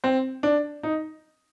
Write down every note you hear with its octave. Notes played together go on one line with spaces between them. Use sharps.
C4
D4
D#4